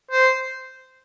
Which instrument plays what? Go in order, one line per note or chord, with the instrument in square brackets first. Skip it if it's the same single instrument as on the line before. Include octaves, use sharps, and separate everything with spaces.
[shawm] C5